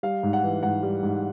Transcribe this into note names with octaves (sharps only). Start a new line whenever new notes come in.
G3 F5
G#2
F#5
E3
G#2 F#5
G3
G#2